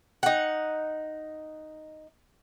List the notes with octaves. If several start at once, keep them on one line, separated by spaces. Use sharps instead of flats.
D#4 F#5